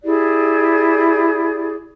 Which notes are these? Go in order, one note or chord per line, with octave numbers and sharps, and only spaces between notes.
E4 G4 G#4 D5